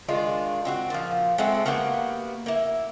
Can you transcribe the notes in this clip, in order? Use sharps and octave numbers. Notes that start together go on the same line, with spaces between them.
D#3 G#3 D4 F4
C4 D4 F#4
A#2 F3
G#3 A3 C4 F#5
A#3 B3 F#4 G4
A#3 E4